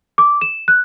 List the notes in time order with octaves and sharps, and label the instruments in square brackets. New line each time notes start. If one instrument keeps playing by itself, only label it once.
[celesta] D6
E7
F#6